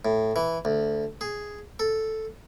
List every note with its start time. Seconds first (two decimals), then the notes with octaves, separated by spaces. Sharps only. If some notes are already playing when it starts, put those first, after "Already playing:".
0.05 A2
0.36 E3
0.65 D2
1.21 G#4
1.80 A4